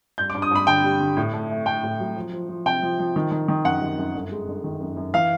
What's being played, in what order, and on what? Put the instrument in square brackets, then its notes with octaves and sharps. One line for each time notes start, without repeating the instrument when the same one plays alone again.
[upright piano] G2 G6
D6
G2
D#6
G2 B5
D3 G5
G3
D3
A2
A3
A3
A3 G5
A2
F#3
F3
F3
F3
C3 G5
F3
F3
D#3
D#3
D#3
F#2 F#5
D#3
F#2
G1
G#3
G1
D#3
F#2
F#2
E3 F5